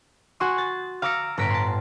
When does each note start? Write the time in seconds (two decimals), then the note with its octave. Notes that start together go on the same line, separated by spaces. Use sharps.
0.40 F#4 G#5 C6 C#6 D#6
0.58 A6
1.02 F5 A#5 D6 E6 A#6 C#7
1.37 G1 A2 A#5 A#6 B6 D7
1.50 A5 C6